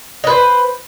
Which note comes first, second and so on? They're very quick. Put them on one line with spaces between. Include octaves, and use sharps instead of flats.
D#5 B4 C5